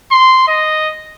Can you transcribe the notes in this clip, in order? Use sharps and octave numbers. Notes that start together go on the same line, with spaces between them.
C6
D#5